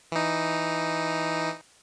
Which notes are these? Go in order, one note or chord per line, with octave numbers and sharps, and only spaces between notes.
E3 D#4